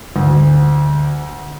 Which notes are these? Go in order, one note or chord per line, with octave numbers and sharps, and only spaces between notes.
D2